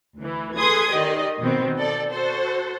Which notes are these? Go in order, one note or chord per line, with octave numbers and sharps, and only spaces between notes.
D2 E3
G#4 A4 B4 C6 D#6 G#6
D#3 G4 D5 D#5
B2 D#3 B3 C4
A4 D5
F#4 A4 C5